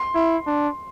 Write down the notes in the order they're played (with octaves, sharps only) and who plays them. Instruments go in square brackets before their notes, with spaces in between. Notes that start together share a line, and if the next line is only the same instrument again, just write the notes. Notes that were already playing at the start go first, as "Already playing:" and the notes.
Already playing: [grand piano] C6
[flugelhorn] E4
D4